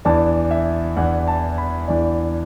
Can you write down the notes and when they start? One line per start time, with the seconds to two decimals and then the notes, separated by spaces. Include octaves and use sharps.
0.05 E2 E3 D4 A5
0.51 E5
0.97 E2 E3 D4 F#5
1.27 A5
1.58 B5
1.88 E2 E3 D4 D5